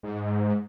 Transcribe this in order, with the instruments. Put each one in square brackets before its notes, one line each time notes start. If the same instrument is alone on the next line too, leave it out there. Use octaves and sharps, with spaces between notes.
[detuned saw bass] G#2